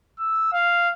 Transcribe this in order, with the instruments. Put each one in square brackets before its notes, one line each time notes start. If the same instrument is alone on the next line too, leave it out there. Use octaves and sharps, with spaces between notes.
[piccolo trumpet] E6
F5